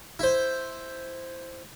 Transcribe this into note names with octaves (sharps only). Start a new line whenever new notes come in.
E4 C5